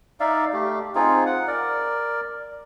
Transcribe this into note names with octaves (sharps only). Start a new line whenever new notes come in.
D#4 D5 E5 F5
A3 G4
C4 D#4 F4 G#4
F#5
A#4 D5